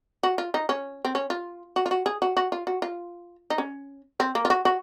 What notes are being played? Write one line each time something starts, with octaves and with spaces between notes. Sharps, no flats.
F#4
F4
D#4
C#4
C4
C#4
F4
F#4
F4
F#4
G#4
F#4
F#4
F4
F#4
F4
D#4
C#4
C4
A#3
F4
F#4
F#4